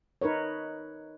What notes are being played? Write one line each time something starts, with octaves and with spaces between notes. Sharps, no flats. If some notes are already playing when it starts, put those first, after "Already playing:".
D#4 A#4 B4 C#5